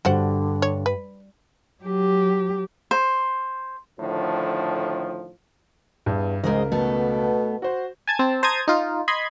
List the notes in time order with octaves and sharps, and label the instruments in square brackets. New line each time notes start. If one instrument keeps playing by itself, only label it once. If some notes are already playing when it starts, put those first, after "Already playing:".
[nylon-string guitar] G2 [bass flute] D3 [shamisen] F#4 C5 F#5
[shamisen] C#5
B4
[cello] F#3 G4
[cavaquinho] C5
[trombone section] A2 D3 D#3 F3
[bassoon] E2 [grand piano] G2
[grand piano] C#2 A#4 [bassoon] G#2 [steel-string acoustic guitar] G#3 C4 D#5
[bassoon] B2 [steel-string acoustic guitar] A3 B3 A4
[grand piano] F#4 C5
[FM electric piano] G#5 A5 G#6
C4 A5
C5 A5 A#5 D#6 G#6
D#4 F4
D#5 B5 C6 G#6